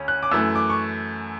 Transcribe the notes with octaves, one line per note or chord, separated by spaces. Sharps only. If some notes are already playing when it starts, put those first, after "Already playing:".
Already playing: D2 C#4
F#6
D6
F#2 E3 A3 E6
D6
C#6